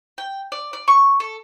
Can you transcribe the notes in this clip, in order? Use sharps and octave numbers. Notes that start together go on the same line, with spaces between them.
G5
D5
D5
C#6
A4